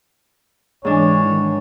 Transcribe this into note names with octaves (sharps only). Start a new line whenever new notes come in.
G#2 E3 G#3 D4 C#5
D#3